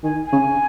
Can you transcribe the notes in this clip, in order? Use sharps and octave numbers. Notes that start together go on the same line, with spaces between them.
D#3 G#5
G#5
C#3